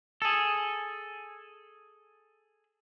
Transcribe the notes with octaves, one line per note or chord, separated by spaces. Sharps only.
G#4 A4